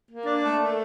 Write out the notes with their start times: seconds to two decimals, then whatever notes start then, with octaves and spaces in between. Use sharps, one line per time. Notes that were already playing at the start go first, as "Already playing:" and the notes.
0.08 A#3
0.26 D4
0.43 A3
0.59 A3